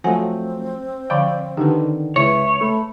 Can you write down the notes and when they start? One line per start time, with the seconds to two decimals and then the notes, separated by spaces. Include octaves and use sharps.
0.04 F3 F#3 A3 C4 C5 F#5 G#5
1.10 D3 F3 D5 F5 G5
1.57 D3 D#3 G4 B4
2.16 C#2 E4 B4 C#5 E5
2.61 A3 B5